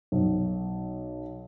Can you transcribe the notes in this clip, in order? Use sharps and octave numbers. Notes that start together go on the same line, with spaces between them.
B1